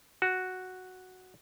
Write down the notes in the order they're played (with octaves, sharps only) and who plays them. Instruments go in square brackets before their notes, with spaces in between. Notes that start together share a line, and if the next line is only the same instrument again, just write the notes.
[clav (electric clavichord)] F#4